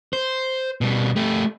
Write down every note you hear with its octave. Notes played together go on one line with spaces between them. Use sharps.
C5
B2 G3
A3 G4